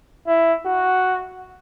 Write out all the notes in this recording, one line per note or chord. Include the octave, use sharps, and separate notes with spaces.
E4
F#4